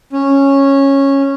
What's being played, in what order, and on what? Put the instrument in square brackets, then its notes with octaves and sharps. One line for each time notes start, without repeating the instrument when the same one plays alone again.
[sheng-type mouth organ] C#4